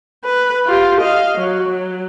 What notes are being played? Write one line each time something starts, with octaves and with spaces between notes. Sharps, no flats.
B4
F4 G4
D#5 F5
F#3 F#4
F#3